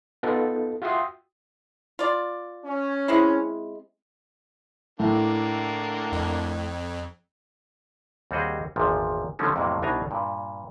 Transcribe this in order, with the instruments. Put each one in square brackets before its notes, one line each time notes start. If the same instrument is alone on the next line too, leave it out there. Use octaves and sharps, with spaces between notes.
[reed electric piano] B3 D#4 F4 A4
F4 F#4 E5 G5 C6 D#6
[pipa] F4 D5
[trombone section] C#4
[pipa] G#3 C4 E4
[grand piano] A2 [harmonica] D3 A#3
[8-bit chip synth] F2
[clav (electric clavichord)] D#2 G3 C4 F#4 G#4 D#5
G#1 E2 A#2 F3
D3 F3 G3 A3 C#4 D#4
F2 A2 C3 F#3 A#3
C2 B2 D4 D#4 G#5 A#5
G2 A#2